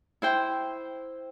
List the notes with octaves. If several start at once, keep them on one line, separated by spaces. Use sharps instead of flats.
E4 C5 G5